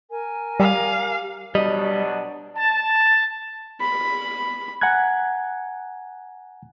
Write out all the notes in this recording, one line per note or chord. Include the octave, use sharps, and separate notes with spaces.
A#4 G#5
G3 G4 F5 G5
B2 F#3 G3 D4 D#5
A5
B5
F#5 G#5 A#5 F#6 G#6